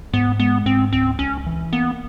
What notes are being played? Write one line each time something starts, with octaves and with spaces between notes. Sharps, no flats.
G#2 B3
G#3 B3
G#2 C4
C#2 C4
C#2 C#4
E3
A#3 B3